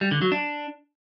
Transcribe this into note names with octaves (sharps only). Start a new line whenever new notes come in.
G3
D3
F#3
D4